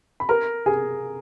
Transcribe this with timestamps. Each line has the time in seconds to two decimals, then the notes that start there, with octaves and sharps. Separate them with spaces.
0.20 B5
0.29 A#4 A#5
0.66 G#4 G#5